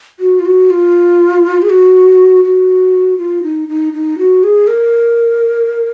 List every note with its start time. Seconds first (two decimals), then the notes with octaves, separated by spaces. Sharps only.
0.20 F#4
0.40 F4
0.46 F#4
0.70 F4
1.62 G#4
1.70 F#4
2.44 F#4
3.18 F4
3.43 D#4
3.69 D#4
3.93 D#4
4.18 F#4
4.43 G#4
4.68 A#4